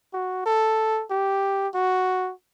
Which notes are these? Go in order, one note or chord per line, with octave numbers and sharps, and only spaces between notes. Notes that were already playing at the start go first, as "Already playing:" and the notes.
F#4
A4
G4
F#4